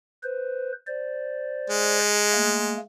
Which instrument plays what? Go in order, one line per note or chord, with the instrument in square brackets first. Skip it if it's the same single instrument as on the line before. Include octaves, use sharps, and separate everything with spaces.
[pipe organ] B4 C5
C5 D5
[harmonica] G#3
[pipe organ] A3 A#3